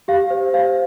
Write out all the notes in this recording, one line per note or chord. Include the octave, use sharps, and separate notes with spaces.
G4 F5
C5
C5 F5